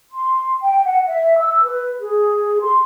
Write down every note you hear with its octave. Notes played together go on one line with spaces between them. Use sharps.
C6
G5
F#5
E5
E6
B4
G#4
C6